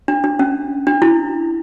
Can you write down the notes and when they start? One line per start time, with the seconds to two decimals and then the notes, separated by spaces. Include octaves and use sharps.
0.08 D4
0.24 D4
0.39 C#4
0.87 D4
1.02 E4